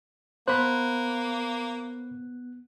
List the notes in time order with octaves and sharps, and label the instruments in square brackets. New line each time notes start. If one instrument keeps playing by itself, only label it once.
[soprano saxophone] A#3 [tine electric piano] B3 F#6 [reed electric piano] C5 B5